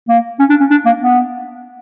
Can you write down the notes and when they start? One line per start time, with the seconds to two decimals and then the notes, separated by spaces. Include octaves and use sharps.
0.08 A#3
0.39 C#4
0.50 D4
0.60 C#4
0.70 D4
0.85 A#3
1.01 B3